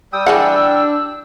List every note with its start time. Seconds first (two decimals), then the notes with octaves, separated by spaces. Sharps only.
0.13 G3 G5 D#6 E6
0.26 E3 D4 G#4 F#5